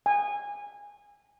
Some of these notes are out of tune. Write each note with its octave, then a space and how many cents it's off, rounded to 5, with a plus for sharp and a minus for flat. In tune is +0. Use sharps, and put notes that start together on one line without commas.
G#5 -20